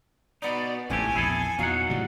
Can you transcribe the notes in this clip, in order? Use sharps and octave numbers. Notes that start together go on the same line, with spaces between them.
B2 B3 D#4 D5
A1 G#2 C3 A3 G4 G#5
A#1 E2 E4 G#4 A4
E2 A#2 F#3 D#4 F5 F#5
A2 C#3 G3 D5